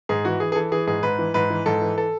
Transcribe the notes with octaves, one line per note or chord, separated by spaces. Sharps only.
G#2 G#4
E3 F#4
E3 G#4
G#4
E3 A4
E3 G#4
G#2 G#4
G#2 B4
E3
G#2 B4
E3
G#2 A4
E3
A4